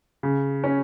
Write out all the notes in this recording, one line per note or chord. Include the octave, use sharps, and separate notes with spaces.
C#3
C#4